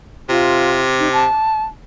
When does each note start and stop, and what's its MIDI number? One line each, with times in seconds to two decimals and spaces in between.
0.29 1.25 48
0.29 0.81 65
0.99 1.09 63
1.12 1.63 81